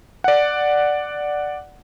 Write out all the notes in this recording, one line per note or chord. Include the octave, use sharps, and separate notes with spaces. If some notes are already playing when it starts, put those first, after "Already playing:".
D5 F#5